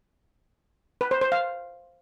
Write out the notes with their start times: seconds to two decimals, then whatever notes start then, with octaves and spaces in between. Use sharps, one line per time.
1.01 B4
1.11 C5
1.21 C5
1.32 F5